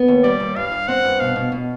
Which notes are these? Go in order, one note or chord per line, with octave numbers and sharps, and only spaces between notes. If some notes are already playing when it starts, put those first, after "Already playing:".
Already playing: B3
D#2
G3 D5
D#2
G2 F5
G2
C4 F#5
G2
B2 F5
B2
B2